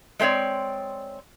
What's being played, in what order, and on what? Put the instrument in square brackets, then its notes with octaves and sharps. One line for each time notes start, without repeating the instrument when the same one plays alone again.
[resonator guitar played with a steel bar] G#3 A3 C4 C#5 D5